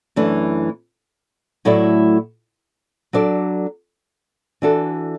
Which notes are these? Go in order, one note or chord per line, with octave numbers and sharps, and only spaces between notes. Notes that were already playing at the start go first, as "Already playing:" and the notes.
F#2 E3 A3 D4
A2 F#3 A3 E4 D5
F#3 D4 A4 D5
E3 D4 F#4 A4